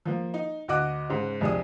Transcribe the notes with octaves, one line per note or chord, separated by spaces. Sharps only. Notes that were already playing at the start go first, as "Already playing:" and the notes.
F3 A#3
D#4
D2 F#4 D#5 D6 F#6
G#2 C#3
C2 F2 D4 G#4 D#6